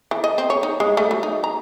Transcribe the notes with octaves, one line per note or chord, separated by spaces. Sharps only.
E3
D#5
C4
C#5
D#4
G#3
A3
F#3
D#4
A#5